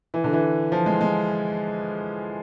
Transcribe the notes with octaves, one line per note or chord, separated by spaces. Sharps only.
E3
D3
E3
F3
G#3
G#3